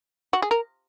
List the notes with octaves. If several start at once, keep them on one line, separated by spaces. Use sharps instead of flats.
F#4
G#4
A#4